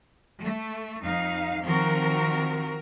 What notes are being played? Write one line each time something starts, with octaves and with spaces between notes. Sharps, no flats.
A3
F2 D#4 F5
D#3 F3 C4 F#4 A#4